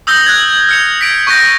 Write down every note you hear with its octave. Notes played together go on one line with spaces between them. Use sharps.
D#6 E6 G6 A#6 F#7 G7
F#6 G#6
F6 C#7 F7
B6 D7
C#6 F#6 G6 A#6